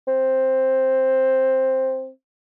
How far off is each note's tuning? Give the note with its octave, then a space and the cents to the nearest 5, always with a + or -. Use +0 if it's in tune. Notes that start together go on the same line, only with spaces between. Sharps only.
C4 +5